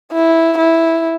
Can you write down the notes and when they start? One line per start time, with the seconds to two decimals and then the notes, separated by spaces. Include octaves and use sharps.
0.12 E4
0.58 E4